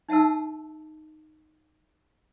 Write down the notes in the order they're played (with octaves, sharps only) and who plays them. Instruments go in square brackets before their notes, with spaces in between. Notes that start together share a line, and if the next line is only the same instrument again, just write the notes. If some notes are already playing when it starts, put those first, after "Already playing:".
[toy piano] D#4 E5 F#5 A5 E6